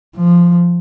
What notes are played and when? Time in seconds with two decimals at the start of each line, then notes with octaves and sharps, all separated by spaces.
0.17 F3